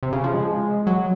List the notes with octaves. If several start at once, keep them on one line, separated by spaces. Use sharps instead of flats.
C3
C#3
F3
G#3
F#3